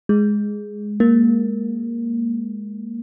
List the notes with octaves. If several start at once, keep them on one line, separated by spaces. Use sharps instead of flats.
G#3
A#3